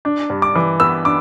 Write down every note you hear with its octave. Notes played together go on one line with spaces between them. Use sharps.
D4
G2
D6
E3
B3 E6
D4 D6